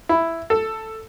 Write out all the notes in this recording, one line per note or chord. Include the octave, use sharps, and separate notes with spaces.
E4
A4